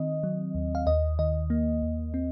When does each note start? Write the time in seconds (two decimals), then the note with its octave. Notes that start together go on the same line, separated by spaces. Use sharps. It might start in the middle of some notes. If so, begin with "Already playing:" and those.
Already playing: D#3 C4 D#5
0.23 F#3
0.55 D#2
0.75 F5
0.87 D#2 D#5
1.19 D#3 D#5
1.50 A#3
1.82 D#2
2.14 C4